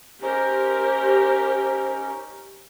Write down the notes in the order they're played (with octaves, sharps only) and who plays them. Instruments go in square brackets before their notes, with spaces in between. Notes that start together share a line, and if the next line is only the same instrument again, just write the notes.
[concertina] C#4 D#4 [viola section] G4 A#4 [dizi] C5